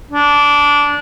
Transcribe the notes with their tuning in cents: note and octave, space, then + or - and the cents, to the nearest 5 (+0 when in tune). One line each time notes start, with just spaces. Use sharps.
D4 -15